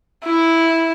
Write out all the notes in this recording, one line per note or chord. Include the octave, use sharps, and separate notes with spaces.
E4